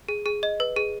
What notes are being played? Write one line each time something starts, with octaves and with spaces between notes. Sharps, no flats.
G#4
G#4
D#5
B4
G#4